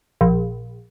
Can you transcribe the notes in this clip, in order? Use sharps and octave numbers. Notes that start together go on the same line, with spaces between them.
A#1